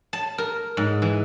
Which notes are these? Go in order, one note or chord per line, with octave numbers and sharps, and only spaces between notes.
A5
A#4
G#2
E3